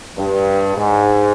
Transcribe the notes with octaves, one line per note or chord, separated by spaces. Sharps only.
G2
G#2